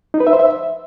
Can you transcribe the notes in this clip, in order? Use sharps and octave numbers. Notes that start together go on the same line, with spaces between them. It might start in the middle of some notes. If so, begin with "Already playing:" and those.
D#4
B4
E5
C5
E5